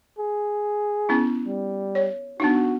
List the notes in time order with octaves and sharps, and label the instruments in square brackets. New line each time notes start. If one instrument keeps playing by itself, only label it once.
[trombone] G#4
[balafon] B3 C#4 E4
[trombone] G3
[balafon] C#5
[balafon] B3 D4 D#4 [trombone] F#4